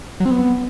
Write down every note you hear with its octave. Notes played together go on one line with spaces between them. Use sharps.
F#3
C4
B3